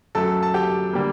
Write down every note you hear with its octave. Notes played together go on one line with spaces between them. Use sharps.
F#2 F#3 A3 A4 A5
A5
G4 G5
D3 G3 A#3